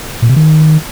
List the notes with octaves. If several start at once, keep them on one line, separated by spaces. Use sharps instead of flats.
A#2
C3
D#3